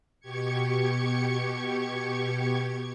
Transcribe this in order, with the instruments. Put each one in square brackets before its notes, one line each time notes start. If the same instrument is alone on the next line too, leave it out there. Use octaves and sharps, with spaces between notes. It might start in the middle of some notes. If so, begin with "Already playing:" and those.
[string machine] B2 G4 C#6 G#6 C#7